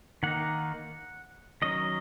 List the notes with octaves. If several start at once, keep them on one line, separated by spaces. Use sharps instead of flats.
D#3 A#3 D#4 F#5
D#3 F#3 C#4 D#5